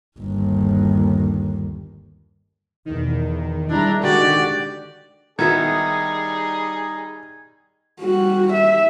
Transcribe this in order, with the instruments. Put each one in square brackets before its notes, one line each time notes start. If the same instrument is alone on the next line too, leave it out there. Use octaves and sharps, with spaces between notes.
[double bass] G1 D#2
[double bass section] E2 B2 [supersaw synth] D#3
[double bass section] G3 G#3 [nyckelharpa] D4 [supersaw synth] E4 A#5
[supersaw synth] D3 F#4 G4 [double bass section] D#3 G#3 [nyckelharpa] D5
[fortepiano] D#3 B3 E4 [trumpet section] G3 G#4 [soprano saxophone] D#4 [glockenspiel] G#6
[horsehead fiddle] G3 F#4
E5